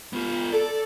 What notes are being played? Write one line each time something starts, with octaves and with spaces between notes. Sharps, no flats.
B3 F4
A4 D5